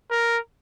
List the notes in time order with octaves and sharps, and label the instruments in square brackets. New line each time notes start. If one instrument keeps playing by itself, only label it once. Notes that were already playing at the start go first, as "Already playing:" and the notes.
[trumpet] A#4